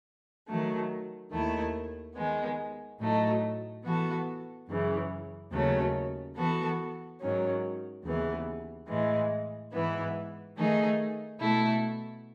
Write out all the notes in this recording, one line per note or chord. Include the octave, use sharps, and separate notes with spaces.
D#3 F#3 A3
D#2 D#3 A3 E4
D#3 G#3 B3
A2 F#3 A3 D#4
E3 B3 F#4 A4
F#2 C#3 E3
D#2 C#3 F#3 A3 C#4
E3 B3 F#4 A4
G#2 D#3 F#3 C#4
D#2 C#3 E3 B3
A2 E3 G#3
G#2 E3 B3 E4
D#3 A3 D#4 G#4
B2 A3 E4 A4